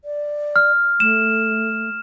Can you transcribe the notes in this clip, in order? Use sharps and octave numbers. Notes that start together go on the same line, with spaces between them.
D5
F6
A3 E7